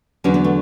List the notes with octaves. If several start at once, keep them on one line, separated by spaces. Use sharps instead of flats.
E2 D3 F#3 C#4
B3
A3